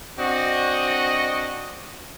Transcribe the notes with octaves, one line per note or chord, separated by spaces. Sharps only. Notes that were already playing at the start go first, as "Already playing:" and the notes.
C4 D4 F#4 D#5